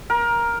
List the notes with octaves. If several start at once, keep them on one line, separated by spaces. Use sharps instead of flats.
A#4